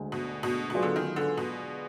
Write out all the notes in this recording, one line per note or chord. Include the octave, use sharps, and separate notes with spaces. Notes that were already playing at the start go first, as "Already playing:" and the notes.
Already playing: D2 D3 G#3
B2
B2
B2 F#3 B3 F4 G#4 D5
D3
D#3
D3
B2